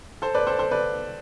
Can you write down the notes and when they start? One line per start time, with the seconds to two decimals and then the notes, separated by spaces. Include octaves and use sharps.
0.22 A4 C5
0.35 B4 D5
0.47 A4 C5
0.59 A4 C5
0.71 B4 D5